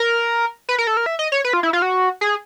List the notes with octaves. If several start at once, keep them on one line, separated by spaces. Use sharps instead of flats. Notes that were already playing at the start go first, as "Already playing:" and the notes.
Already playing: A#4
B4
A#4
A4
A#4
E5
D#5
C#5
B4
F4
E4
F4
F#4
G#4